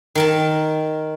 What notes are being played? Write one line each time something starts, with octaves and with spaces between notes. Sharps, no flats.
D#3 A#4 A5